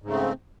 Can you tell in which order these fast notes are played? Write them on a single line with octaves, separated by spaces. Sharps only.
G#2 C#3 A3 C4